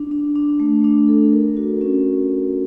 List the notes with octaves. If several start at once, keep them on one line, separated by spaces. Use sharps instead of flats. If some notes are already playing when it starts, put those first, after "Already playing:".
Already playing: D4
D4
D4
A3
D4
A4
A#4
F#4
C#4